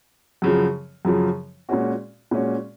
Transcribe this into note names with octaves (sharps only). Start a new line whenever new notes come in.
F#2 C#3 F3
F#2 C#3 F3
A#2 G#3 C#4 F#4
A#2 G#3 C#4 F#4